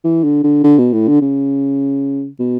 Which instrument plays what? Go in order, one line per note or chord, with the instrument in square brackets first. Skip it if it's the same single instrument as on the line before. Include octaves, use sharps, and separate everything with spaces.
[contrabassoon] E3
D3
D3
D3
B2
A2
D3
C#3
B2